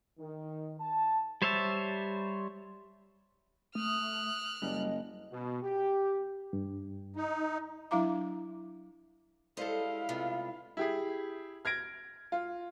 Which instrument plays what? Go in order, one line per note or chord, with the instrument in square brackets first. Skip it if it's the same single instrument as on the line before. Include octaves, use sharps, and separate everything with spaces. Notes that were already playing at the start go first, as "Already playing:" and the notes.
[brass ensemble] D#3
A5
[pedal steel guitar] G3 C5 C#5 E5 A5
[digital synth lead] A3 [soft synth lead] D#6 [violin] F6 F#6
[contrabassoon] F#1 [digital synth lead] G3 [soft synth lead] D#5
[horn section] B2
G4
[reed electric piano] G2
[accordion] D#4
[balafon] F#3 D4 E4 F5 A#5 D6
[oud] G3 G#3 A4 [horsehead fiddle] E4 F5 [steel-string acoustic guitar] C5 D#5
[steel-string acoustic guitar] C3 B3 F4
[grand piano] E4 G4 G#4
F6 G#6 A#6 D7
F4